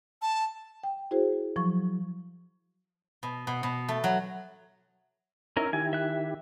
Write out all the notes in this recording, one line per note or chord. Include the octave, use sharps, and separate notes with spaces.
A5
G5
E4 F#4 G#4 C5
F3 F#3 C#6
B2
B2
B2
A3
F#3
C#4 D#4 E4 A#4 E5
D#3 E4 G4 G#5
E5 F#6